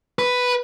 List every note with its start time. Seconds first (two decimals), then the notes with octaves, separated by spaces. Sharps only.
0.19 B4